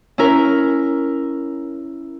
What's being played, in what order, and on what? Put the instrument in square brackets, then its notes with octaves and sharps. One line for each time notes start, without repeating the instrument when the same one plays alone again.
[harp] C#4 E4 A#4